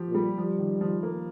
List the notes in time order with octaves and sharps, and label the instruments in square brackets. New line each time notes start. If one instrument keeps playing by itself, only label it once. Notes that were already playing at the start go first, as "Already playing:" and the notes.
Already playing: [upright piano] F3 G4
[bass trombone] A#2
[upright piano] G3
[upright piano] F3 [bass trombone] G3
[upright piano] D#3
F3
A#3